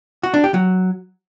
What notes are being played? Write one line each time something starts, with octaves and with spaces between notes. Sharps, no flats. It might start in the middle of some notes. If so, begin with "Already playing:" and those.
F#4
D4
G4
F#3